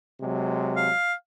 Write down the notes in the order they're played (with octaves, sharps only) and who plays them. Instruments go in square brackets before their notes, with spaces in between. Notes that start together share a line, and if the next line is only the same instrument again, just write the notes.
[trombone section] C3 F#3 G#3
[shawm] F5